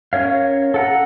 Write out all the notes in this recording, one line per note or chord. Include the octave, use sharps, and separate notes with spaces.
C#4 A#4 C#5 F5
A4 F#5 A#5